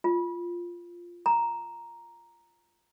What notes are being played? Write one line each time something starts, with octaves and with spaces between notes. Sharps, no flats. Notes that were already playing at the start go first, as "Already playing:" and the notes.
F4
A#5